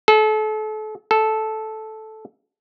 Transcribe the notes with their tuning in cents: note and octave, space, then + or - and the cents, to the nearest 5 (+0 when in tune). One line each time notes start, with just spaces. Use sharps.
A4 -35
A4 -10